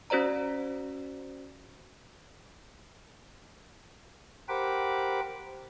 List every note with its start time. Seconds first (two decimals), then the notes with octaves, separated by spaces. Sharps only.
0.10 C#4 F#4 C5 D5 A#5
4.49 G4 A#4 C5 F#5 B5 D6